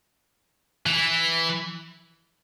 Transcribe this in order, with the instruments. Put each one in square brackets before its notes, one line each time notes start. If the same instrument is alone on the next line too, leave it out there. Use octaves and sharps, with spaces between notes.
[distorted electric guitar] E3